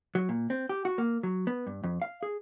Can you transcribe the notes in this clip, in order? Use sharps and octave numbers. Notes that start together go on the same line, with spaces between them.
F#3
A#2
C4
G4
F#4
A#3
F#3
B3
G2
F2
F5
G#4